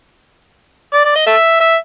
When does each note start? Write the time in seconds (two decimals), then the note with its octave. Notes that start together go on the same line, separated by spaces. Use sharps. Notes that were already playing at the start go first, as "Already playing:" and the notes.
0.94 D5
1.05 D5
1.16 D#5
1.27 A4 E5
1.60 E5